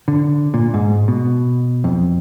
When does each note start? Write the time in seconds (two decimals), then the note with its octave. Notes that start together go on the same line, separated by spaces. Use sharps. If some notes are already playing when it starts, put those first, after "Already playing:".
0.08 D3
0.54 A#2
0.74 G#2
1.08 B2
1.84 F2